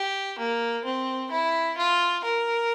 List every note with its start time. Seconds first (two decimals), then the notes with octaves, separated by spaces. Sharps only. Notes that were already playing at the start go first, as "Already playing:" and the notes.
Already playing: G4
0.39 A#3
0.85 C4
1.32 E4
1.78 F4
2.24 A#4